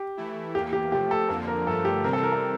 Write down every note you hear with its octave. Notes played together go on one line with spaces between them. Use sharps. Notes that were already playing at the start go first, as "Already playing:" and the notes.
Already playing: G4
E3 A3 E4
E2 E3 A#3 G4
G4
C3 F3 A3 G4
A4
F2 D3 F3 A#3 A4
A#4
G2 D3 F3 A3 A4
G4
C3 E3 G3 C4 A#4
A4
A#4
A4